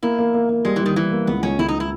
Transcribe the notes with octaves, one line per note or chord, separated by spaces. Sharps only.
A#3 E4
A#3
A#3
A#3
G3 G#3
E3
D#3 G3
E3 G3
A#3
C#2 B3
C#2 C#4
C#2 E4
D#4
E4